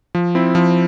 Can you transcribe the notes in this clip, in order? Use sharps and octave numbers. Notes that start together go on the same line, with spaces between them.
F3
C4 E4
F3